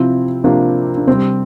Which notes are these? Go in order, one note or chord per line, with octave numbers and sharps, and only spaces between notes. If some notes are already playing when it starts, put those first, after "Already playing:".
Already playing: C3 F3 C4 E4
C3 F3 A#3 D4
D4
C3 G3 C4